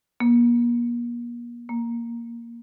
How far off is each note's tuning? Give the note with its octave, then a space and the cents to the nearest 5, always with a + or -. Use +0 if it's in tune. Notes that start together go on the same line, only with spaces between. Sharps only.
A#3 +40
A#3 +5